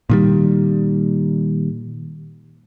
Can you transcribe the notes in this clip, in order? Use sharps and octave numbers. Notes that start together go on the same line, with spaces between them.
A#2 D#3 G3